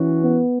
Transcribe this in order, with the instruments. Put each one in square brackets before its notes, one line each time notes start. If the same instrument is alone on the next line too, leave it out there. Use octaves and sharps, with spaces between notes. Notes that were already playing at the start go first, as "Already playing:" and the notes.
Already playing: [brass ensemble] E3 C#4 F#4
[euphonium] B3